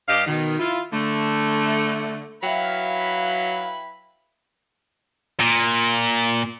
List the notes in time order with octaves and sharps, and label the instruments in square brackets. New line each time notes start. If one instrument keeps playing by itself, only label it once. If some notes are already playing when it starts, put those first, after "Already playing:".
[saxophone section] G2 D4 G4 D#5 F5
B2 D#3
E4 F4
D3 A3
[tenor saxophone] F#3 [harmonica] E4 B4 B5 [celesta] E5 G5 [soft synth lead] F5
[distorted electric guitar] A#2